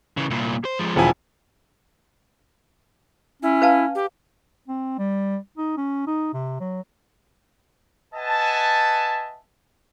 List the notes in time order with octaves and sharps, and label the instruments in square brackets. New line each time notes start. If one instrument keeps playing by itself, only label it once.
[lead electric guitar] C#3 E3
C2 A#2
C5
F3 G#3
[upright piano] E1 F3 G#5 [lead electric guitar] B3 E4
[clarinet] C#4 [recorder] E4
[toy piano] B4 F5 A5
[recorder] G4
[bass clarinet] C4
G3
D#4
C#4
D#4
C3
F#3
[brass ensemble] B4 D#5 E5 F#5 G#5 A5